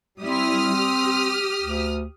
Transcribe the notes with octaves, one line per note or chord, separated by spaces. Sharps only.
G3 C4 E4 D#6 F6
G4
D2